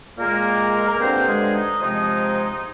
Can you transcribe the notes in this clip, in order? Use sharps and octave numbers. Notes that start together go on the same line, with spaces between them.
A#2 G#3 A#3 A#4
A#4
G2 D3 F3 C4 C5
G#3 G#4
D#4
C3 F3 G#3 D#4